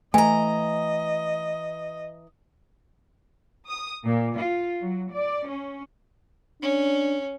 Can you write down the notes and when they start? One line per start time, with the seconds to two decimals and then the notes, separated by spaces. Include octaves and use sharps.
0.14 E3 A3 D#5 G#5 A#5
3.67 D#6
4.03 A#2
4.38 F4
4.80 F#3
5.12 D5
5.49 C#4
6.62 C#4 D4